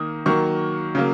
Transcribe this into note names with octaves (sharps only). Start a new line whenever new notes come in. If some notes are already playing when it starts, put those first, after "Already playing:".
Already playing: D#3 A#3 D#6
D#3 F#3 A#3 C#6
C#3 F#3 A#3